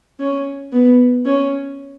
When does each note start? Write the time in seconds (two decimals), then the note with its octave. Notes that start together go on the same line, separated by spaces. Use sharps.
0.20 C#4
0.72 B3
1.25 C#4